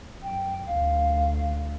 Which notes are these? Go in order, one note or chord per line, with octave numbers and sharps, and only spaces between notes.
F#2 G5
D2 F5